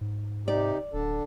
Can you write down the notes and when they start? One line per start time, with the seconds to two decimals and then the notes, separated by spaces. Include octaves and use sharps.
0.01 G#2
0.48 C3 D#4 G4 D5
0.93 D1 D3 D4 A4